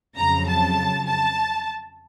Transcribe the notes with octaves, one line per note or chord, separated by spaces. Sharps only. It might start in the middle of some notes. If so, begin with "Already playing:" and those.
F2 C#3 F#3 A#5
A5
A5